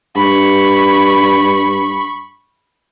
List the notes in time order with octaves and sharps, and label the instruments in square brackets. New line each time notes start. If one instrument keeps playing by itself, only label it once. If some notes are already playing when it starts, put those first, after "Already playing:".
[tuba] G2 [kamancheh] B5 C#6